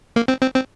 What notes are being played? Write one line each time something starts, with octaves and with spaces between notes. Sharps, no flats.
A#3
C4
C4
C4